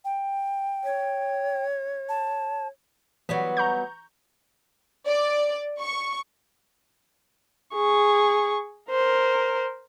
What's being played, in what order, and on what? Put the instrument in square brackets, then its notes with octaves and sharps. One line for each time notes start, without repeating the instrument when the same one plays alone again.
[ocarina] G5
[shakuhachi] C#5
[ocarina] A5
[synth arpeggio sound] E3 [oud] F#3 G3 B3
[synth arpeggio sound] A#5 C#6 G6
[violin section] D5
C#6
[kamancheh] G#4 C#6
A#4 C5